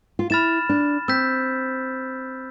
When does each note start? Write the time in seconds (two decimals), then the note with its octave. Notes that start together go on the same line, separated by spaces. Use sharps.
0.19 F4
0.30 E4 B5 F6 A6 E7
0.69 D4
1.08 C4 E6 G6 B6